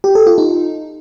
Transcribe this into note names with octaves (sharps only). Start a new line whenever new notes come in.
G4
A4
F4
D#4